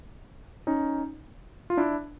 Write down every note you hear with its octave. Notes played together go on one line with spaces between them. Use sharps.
C#4 D#4
F4
D4 E4